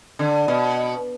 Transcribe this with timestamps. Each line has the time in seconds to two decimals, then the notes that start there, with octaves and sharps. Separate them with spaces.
0.19 D3
0.48 B2